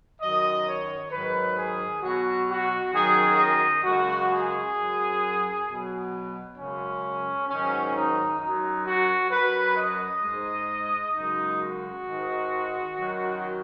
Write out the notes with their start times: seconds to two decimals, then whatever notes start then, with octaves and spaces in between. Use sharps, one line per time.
0.20 F#2 D#3 F#3 D#5
0.66 C#5
1.11 G#2 D#3 F#3 B4
1.57 G#4
2.02 B2 F#3 F#4
2.48 F#4
2.93 F#2 D#3 F#3 G#4
3.38 D#5
3.84 F#2 C#3 G#3 F#4
4.30 G#4
4.75 F#2 F#3
5.66 B2 F#3
6.57 F#2 C#3 G#3 C#4
7.48 G#2 D#3 F#3 C#4
7.95 D#4
8.39 F#2 F#3 D#4
8.86 F#4
9.31 F#2 F#3 B4
9.77 D#5
10.21 G#2 G#3
11.12 F#2 C#3 G#3 D#4
11.59 F#4
12.04 G#2 D#3 G#3
12.95 F#2 D#3 F#3